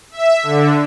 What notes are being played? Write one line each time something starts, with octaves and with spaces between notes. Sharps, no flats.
E5
D3